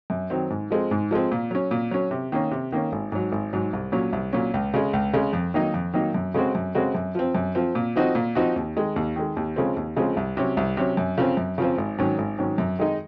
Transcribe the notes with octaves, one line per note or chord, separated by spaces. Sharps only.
F#2
D#3 F#3 C4
G#2
F3 G#3 C4
G#2
F3 G#3 C4
A#2
F#3 C#4
A#2
F#3 C#4
C3
D#3 A#3 C#4
C3
D#3 A#3 C#4
G#1
G#2 F#3
G#1
G#2 F#3
C2
A#2 F#3 C#4
C2
A#2 F#3 C#4
C#2
C#3 G#3
C#2
C#3 G#3
F2
D#3 F#3 A#3 D#4
F2
D#3 F#3 A#3 D#4
F#2
C#3 G#3 C4 F#4
F#2
C#3 G#3 C4 F#4
F#2
F3 C4
F#2
F3 C4
A#2
F3 C4 D#4 F#4
A#2
F3 C4 D#4 F#4
D#2
D#3 G#3
D#2
D#3 G#3
D#2
C#3 F3 G#3 C4
D#2
C#3 F3 G#3 C4
C2
C3 F#3 C#4
C2
C3 F#3 C#4
F#2
C#3 F3 C4
F#2
C#3 F3 C4
G#1
G#2 D#3 F#3 C#4
G#1
G#2 D#3 F#3 C#4
F#2
D#3 G#3 D#4